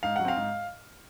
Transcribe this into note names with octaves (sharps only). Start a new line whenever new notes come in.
G#2 F5
F#3 F#5
C4 F5
G#2